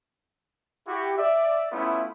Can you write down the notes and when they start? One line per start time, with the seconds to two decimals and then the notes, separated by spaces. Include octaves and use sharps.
0.87 E4 F#4 G4
1.17 D5 E5
1.72 A3 B3 C#4 E4 F4